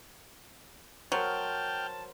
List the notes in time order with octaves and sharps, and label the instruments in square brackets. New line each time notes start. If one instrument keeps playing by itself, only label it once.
[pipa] F#3 [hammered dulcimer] A#4 C5 [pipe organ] G5 F6 G6 [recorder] A5